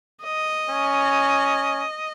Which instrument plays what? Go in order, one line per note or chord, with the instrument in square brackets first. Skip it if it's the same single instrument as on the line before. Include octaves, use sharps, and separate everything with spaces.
[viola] D#5
[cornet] C#4